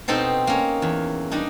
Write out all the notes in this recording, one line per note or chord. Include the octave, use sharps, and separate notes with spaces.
B2 C4 D#4 A4 C5
A#3 C#4
E2
G3 D4 D#4